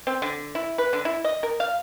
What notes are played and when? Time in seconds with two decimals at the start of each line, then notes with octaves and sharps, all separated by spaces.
0.07 C4
0.22 D3
0.55 E4
0.78 B4
0.93 D3
1.05 E4
1.24 D#5
1.43 A#4
1.60 F5